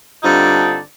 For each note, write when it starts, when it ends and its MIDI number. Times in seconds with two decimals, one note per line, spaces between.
0.23 0.78 43
0.23 0.78 50
0.23 0.78 60
0.23 0.78 63
0.23 0.78 65
0.23 0.78 74